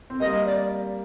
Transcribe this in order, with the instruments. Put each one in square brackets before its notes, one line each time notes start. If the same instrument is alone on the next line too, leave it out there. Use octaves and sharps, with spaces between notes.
[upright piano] C4
[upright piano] G3 A#3 [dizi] D#5
[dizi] D5